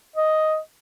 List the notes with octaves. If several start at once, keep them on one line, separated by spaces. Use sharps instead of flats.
D#5